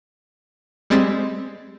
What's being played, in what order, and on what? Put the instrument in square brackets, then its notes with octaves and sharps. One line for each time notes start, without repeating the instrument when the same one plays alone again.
[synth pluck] G3 G#3 C4 A6 B6